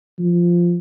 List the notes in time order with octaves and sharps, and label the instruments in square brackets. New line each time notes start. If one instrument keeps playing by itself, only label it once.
[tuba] F3